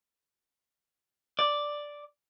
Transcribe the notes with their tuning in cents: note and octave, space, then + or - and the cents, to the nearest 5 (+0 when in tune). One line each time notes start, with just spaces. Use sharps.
D5 +0